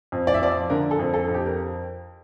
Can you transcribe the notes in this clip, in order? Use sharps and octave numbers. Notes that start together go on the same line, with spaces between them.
F2
D5
E5
F3 D5
D3 A#4
A4
F2
A4
F2
G4
A#4